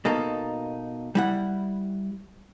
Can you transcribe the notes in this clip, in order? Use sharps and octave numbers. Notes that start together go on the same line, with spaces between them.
B2 A#3 D#4 A4
G3 E4 F#5